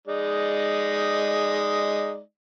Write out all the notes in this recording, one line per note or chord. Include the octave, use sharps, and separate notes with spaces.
G#3 D#4 D5